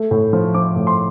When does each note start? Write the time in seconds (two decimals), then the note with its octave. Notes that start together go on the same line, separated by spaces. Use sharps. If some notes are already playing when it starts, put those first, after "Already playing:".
Already playing: A3
0.11 A2
0.33 F3
0.54 F3 D6
0.76 A2
0.87 C6